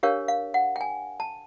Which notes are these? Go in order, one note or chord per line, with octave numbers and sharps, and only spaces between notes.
D4 G4 A#4 C#5 F5
F5
F#5
G5
G#5
A5